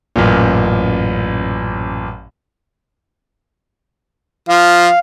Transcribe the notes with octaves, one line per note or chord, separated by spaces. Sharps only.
A1 F#2 A#2
F3 F5